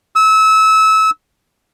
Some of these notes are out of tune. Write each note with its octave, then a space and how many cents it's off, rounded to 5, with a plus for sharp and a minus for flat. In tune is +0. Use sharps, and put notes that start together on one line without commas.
E6 -25